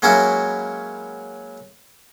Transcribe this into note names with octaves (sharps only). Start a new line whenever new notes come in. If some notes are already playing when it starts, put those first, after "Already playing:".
F#3 G#3 A#3 C#4 E4 F#4